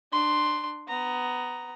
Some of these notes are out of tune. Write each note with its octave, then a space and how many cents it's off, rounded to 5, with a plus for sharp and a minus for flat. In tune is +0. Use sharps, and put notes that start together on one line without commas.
D4 +25 C6 +0
B3 +15 A#5 +0